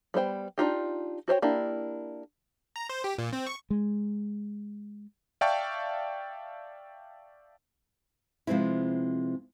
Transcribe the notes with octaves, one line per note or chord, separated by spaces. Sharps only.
G3 B3 C5 G5
D4 D#4 F4 G4
F#4 C5 C#5 G5
A#3 D4 E4 G4
A#5
C5
G4
A#2
C4
C#6
G#3
D5 E5 F5 G5 A5 C#6
C3 F3 G#3 B3 C4 E4